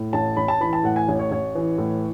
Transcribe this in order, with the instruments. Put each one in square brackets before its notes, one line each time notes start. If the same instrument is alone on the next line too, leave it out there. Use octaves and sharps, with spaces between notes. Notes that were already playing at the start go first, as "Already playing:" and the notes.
Already playing: [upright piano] A2
A1 A5
A1 B5
A5
E3 B5
A5
A2 F#5
G#5
A1
C#5
A1 C#5
E3
A2